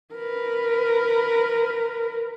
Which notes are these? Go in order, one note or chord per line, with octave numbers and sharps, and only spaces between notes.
A#4 B4